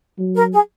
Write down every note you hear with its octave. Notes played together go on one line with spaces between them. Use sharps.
F#3
A#4
G#4